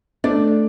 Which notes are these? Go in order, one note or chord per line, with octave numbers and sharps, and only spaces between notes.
A3 D4 D5